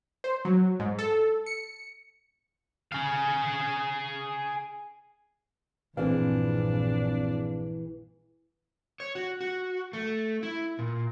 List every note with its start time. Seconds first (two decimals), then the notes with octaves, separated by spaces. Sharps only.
0.24 C5
0.45 F#3
0.80 G#2
0.99 A4
1.46 C#7
2.92 G#4 F5
5.97 A#1 G2 E3 C4 D4 G#4 F5
9.00 C#5
9.15 F#4
9.41 F#4
9.93 A3
10.43 E4
10.79 A#2